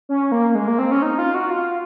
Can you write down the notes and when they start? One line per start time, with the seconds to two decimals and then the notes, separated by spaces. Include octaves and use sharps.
0.09 C#4
0.32 A#3
0.55 G#3
0.68 A#3
0.79 C4
0.91 C#4
1.02 D#4
1.18 F4
1.34 F#4
1.50 F4